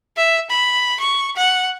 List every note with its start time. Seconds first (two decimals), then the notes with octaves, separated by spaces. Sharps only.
0.17 E5
0.50 B5
1.00 C#6
1.36 F#5